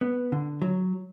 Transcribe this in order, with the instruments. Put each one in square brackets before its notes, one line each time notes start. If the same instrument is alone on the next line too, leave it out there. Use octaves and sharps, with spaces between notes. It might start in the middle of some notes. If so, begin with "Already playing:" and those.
[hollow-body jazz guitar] B3
D3
F#3